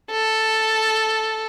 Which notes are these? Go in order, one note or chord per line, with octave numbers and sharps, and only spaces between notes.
A4